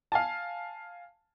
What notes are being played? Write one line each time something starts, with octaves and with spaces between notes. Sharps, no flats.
F5 G#5 A5